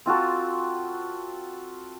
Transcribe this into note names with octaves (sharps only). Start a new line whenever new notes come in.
C4 F4 F#4 A4